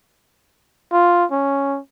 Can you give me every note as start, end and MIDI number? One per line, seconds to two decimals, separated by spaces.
0.92 1.25 65
1.31 1.79 61